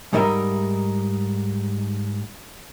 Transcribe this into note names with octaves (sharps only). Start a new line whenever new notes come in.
G#2 G3 D#4 A#4 D#5 E5